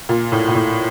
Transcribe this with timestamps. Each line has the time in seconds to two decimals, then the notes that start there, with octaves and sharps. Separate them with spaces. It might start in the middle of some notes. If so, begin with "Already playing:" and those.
0.09 A#2
0.32 A2
0.48 A#2
0.55 A2